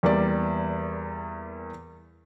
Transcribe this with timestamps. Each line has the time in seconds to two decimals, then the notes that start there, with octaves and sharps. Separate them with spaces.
0.03 E2 G3 A#3 D5